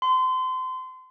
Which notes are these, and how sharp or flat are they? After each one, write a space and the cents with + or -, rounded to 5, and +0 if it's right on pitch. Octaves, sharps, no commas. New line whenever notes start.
C6 -30